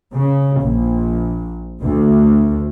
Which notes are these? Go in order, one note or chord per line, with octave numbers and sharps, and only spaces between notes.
C#3
A#1
D2